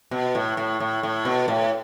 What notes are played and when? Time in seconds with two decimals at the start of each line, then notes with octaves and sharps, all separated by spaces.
0.11 B2
0.35 A2
0.57 A2
0.80 A2
1.03 A2
1.25 B2
1.48 A2